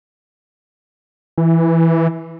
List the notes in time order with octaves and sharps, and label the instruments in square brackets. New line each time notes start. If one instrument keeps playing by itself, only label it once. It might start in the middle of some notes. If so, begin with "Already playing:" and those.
[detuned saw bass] E3